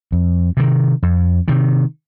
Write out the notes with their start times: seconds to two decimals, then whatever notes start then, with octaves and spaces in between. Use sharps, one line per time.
0.12 F2
0.57 C3 D#3
1.02 F2
1.48 C3 D#3